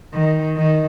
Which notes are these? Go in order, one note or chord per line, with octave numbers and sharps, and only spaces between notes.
D#3
D#3